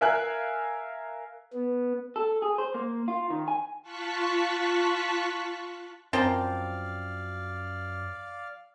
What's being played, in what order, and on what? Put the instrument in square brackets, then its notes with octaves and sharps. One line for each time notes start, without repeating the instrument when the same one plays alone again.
[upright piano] A#4 E5 F5 G#5 E6 F#6
[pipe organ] B3
[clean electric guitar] A4
G#4
C5
A#3
F4
D#3
G#5
[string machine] F4 A5 C#6 F#6 B6
[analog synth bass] F#2 [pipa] F3 A#4 G5 [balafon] C4 [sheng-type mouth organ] D5 F5